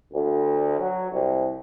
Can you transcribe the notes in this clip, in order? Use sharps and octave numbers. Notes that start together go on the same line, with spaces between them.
D2
F#3
C2